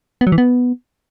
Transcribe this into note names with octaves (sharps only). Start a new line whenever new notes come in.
B3
F#3
E3
B3